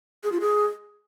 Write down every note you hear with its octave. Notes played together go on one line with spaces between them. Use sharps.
G#4
F4
G#4